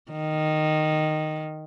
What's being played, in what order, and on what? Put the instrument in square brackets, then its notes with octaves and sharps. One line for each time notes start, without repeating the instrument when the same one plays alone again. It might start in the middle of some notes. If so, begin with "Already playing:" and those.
[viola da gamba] D#3